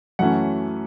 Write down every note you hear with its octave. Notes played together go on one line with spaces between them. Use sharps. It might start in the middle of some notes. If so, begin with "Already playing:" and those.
F#2 E3 A3 C#4 F#5